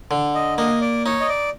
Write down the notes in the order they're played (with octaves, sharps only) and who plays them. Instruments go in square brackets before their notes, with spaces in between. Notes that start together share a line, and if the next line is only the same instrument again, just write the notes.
[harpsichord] D3
[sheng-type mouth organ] D#5
[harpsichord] A#3 [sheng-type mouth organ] D#5
[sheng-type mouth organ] D5
[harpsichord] D#4 [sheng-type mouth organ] C#5
[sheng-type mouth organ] D#5
D5